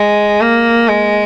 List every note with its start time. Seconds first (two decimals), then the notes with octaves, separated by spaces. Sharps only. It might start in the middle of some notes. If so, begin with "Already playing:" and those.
Already playing: G#3
0.41 A#3
0.88 G#3